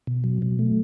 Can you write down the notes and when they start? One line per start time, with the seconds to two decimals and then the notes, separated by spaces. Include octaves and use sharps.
0.07 B2
0.24 F#3
0.42 B2
0.59 A3